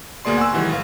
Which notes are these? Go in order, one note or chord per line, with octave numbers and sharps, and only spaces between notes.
D2 B2 A#3 G#4 D5 C6
F#5 G#5 C6 C#6 E6
C3 D#3 E3 F#3 G#3
A1 F5